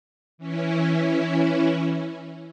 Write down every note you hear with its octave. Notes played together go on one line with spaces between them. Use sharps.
E3 C#4 E4